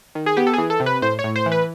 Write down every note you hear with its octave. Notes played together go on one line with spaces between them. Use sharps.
D#3
G#4
B3 G4
A4
E3 G#4
A4
C3
B4
A2 C5
C#5
A2
C5
E3
B4